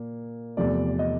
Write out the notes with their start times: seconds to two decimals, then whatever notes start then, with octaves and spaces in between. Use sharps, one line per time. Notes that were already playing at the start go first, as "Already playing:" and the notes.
Already playing: A#2 A#3
0.57 E2 C3 F3 A3 D5
0.99 D#5